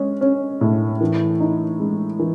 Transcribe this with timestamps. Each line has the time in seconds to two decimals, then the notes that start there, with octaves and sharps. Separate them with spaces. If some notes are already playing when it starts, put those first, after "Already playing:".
Already playing: G#3 C#4
0.21 C#4
0.61 A2
1.01 E3
1.40 D#4
1.80 G#3
2.20 E3